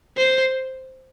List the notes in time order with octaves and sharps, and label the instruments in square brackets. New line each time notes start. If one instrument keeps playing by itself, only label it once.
[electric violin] C5